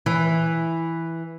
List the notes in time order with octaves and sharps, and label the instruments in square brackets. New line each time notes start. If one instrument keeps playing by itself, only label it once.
[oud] E3